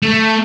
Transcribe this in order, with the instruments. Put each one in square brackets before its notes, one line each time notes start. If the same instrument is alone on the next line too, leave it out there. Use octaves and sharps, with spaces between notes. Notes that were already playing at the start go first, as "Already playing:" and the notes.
[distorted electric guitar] A3